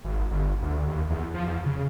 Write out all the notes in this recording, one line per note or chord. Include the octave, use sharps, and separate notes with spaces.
G#1
G1
D2
D#2
E2
F3
E2
C#3